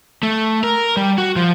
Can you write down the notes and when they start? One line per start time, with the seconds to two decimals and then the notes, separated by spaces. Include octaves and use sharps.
0.23 A3
0.64 A#4
0.97 G3
1.18 F#4
1.36 F3